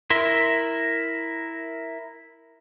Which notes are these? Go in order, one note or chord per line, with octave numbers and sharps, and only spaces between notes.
E4 A#4 E5 C6